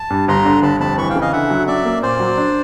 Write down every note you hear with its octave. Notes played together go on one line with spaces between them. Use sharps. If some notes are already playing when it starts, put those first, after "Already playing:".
Already playing: A5
G2
G1 A#5 C6
D3
G1 A5 B5
F2 A5 B5
E3 B5 C#6
F5 G5
C#3
D#5 F5
D3 E5 F#5
F#3
C#4 D5 E5
A#3
A#2 C5 D5
F#3
D4